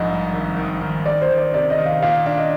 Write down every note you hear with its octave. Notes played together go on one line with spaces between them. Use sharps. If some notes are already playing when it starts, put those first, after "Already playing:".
Already playing: A#1 G#2 D#5
G2
G#1
D#3
D#3
D#3 D5
C5
D#3
D5
C3 D5
D#5
D#3
F5
A#2 F5
D4 F5
D#5